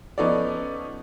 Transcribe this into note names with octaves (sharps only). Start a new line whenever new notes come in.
F3 B3 C#4 D#4 A4 D5